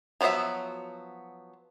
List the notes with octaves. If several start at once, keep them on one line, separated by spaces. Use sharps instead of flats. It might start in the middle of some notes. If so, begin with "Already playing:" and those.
F3 F#3 B3 F#4 E5